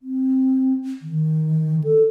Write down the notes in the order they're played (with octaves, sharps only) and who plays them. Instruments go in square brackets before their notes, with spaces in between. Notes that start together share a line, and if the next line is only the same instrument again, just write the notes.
[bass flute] C4
D#3
A4